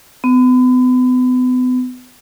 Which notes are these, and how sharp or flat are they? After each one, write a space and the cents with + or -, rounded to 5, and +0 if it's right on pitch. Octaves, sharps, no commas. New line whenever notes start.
B3 +35